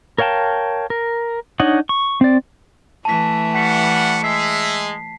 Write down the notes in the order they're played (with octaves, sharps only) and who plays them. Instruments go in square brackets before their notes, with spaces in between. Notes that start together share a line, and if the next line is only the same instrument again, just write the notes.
[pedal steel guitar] A#4 C#5 F5 G5 A5
A#4
D4 D#4 C#5 D#5 F#5
C#6
C4 D5
[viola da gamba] E3 A3 [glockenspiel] A5 B6
[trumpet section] G3 F#5 [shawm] C#6 [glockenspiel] B6
[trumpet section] G#3 [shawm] E5 [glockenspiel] C7